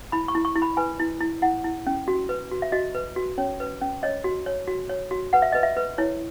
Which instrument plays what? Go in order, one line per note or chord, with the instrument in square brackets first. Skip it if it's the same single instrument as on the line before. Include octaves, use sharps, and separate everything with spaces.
[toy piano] E4 B5
C#6
E4
C#6
E4
B5
B4 G#5
E4
E4
E4 F#5
E4
C#4
F#4
B4
F#4
E5
F#4 D#5
B4
F#4
C#4 C#5
B4
C#4
C#5 D#5
F#4
C#5
F#4
C#5
F#4
B4 F#5
E5
B4 D#5
E5
B4
E4 C#5